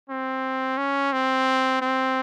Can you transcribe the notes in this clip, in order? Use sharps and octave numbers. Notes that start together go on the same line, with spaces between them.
C4
C#4
C4
C4